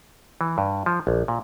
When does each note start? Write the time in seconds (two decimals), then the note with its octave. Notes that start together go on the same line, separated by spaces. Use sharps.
0.41 E3
0.58 G2
0.86 F3
1.07 A#1
1.28 A#2